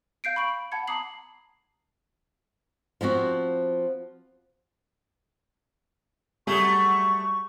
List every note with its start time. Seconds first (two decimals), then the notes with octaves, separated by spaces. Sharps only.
0.24 F5 G6 C7 D7
0.36 B5 C#6 D7 F#7
0.72 F#5 A5 B5 G#6 C#7
0.88 A5 A#5 D6 D#6 C7 F#7
3.01 F3 B3 C4 F#4
6.47 F#3 G3 A3 G#4 C#6